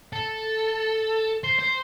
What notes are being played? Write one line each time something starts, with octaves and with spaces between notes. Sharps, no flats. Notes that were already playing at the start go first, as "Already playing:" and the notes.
A4
C5
C5